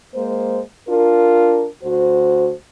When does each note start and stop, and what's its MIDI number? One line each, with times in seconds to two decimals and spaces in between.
0.15 0.61 56
0.15 0.61 58
0.15 0.61 72
0.89 1.67 62
0.89 1.67 65
0.89 1.67 70
1.83 2.51 38
1.83 2.51 66
1.83 2.51 72